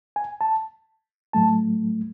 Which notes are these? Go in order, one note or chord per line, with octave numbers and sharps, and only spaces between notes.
G#5
A5
A2 F#3 A3 A5